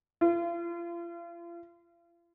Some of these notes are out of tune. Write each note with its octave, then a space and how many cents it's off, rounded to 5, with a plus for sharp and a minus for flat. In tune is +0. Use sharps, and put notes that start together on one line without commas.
F4 -40